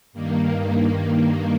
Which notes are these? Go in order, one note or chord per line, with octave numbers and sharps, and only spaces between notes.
G2 D#3 A#3